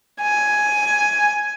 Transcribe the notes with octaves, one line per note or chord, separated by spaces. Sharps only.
G#5